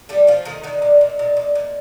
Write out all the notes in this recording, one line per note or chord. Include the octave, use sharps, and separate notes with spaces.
G3 A3 G4
F3 A3 F4
D#3 A3 D#4
D3 D#3 D#4
A#2
A#2
A#2
A#2
A#2